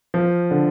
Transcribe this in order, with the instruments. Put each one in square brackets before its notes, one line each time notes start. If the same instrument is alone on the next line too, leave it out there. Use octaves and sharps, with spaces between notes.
[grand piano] F3
D3